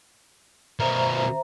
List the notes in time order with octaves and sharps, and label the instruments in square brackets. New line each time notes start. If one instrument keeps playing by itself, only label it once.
[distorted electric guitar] B2 A#4 [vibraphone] C5 E5 A#5